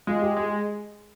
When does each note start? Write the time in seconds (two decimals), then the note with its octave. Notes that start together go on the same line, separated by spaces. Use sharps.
0.07 G#3 F4
0.22 G4
0.36 G#3 G#4